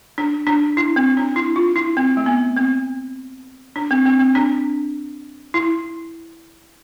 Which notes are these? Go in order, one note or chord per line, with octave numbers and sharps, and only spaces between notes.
D4
D4
E4
C4
D4
E4
F4
E4
C4
A3
B3
C4
D4
C4
C4
C4
D4
E4